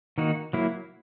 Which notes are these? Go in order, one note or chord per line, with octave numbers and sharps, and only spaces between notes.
D#3 A#3 D#4 F#4
F#3 A#3 E4